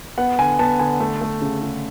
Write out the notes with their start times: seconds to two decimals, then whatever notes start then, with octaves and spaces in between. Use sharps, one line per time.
0.18 B3 F#5
0.39 D3 G#5
0.59 B3 A5
0.80 D3 G#5
1.00 A3
1.21 A3
1.41 C#3
1.62 C#3